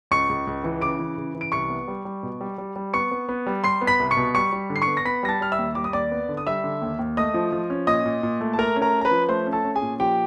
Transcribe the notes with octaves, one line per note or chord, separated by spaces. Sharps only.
C#2 C#6 C#7
C#2
C#2
E3
C#3 D6 D7
E3
C#3
E3
D7
C2 C#6 C#7
B3
G3
G3
B2
G3
G3
G3
B3 C#6 C#7
B3
B3
G3
G3 C6 C7
B3
B5 B6
C2
C#6 C#7
B2
G3 C#6 C#7
G3
D3
C7
C#6 C#7
B3
A#6
B3 B5 B6
G3 A#6
A5 A6
G3 F6
E5 E6
D#2
G3 D6
D#6
D#2 D5 D6
B3
D3
D#6
G3 E5 E6
D3
D#2
D#2
A3 D#5 D#6
F3
F3
C#4
A#2 D#5 D#6
A#2
A#2
A3
A5
A3 A#4 A#5
C#4
A#4 A#5
C#4
A#5
B4 B5
F3
A3 C5 C6
C#4
A4 A5
C#4
G#4 G#5
A#2
F3 G4 G5